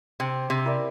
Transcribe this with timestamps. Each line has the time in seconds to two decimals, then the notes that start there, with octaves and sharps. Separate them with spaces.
0.20 C3 C4
0.50 C3
0.65 E4 A#4 D5